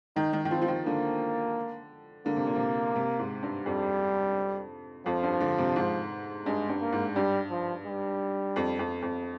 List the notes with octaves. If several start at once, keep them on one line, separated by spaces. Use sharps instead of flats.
D#3 D#4
D#3
D#3
F3 C4
F3
D#3
D3 A#3
D3 A#3
C3
A#2
C3
C3
G#2
G2
F2 G3
F2 F3
G2
D3
C3
G#2
G2 G#3
G2
A#3
G#2
G2 G3
F3
G3
F2
F2
F2